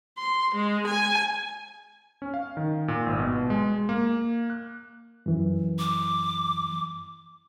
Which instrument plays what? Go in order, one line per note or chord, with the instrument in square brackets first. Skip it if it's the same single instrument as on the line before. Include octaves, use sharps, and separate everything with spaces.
[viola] C6
G#3
G#5
[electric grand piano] C#4
F5
D#3
A#2
G#1
B2
G#3
A#3
F#6
[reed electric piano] F#2 E3
[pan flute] D6